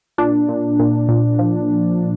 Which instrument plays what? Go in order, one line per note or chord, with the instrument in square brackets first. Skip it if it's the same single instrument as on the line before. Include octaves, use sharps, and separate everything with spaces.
[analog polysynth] A#2 D4
A#2
A#2
A#2
F3